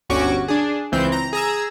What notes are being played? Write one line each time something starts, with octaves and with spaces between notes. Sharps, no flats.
G1 D2 C#4 F#4 C#6 D6
D4 G#4
C#2 E3 C4 G6
A#5
G#4 A#5 E6